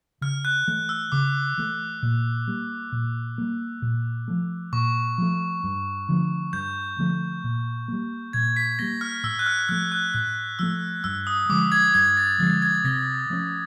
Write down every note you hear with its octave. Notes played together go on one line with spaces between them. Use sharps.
C#3 F6
F#6
E3 A3
E6
C#3 D6
E3 A3
A#2
G3 A#3
A#2
G3 A#3
A#2
F3 A3
A#2 C#6
F3 A3
G2
D3 F3 A3
G2 G6
D3 F3 A3
A#2
G3 A#3
A#2 G#6
B6
G3 A#3 A#6
F6
A2 E6
F#6
F6
F3 A3 F6
F#6
A2 F#6
F3 A3 E6
G2 E6
D#6
D3 F3 G#3 D6
G#6
G2 G#6
A6
D3 F3 G#3 A6
G#6
C3 A#6
F3 A3 C#4